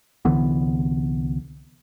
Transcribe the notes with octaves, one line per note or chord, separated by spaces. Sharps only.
C2 D3 E3 B3